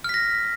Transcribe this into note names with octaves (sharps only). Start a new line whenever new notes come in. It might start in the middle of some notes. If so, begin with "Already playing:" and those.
F6 A#6 B6